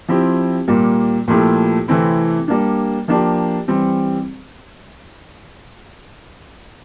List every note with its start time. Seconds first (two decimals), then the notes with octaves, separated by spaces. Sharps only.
0.09 F3 C4 E4 G4
0.68 A#2 G3 A#3
1.28 A#2 F3 A3 E4 G4
1.88 C3 E3 A3 C4 E4
2.48 G3 A#3 D4
3.08 F3 A#3 D4 G4
3.68 E3 G3 C4